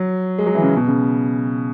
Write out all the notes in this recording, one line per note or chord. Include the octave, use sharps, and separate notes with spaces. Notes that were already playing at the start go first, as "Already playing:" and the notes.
Already playing: F#3
G#3
F#3
E3
C#3
B2
C#3